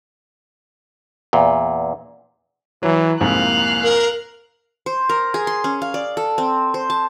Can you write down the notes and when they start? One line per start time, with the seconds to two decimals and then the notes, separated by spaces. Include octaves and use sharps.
1.33 E2 A#2
2.83 E3 F#3
3.21 C2 F2 G#2 A#3 F5 F#6
3.83 A#4
4.86 C5
5.09 A#4
5.34 G#4
5.47 C6
5.64 C#4
5.82 F5
5.94 D5
6.17 A4
6.38 C4
6.74 C5
6.90 A5